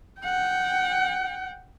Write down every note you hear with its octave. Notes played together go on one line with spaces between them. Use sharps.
F#5 G5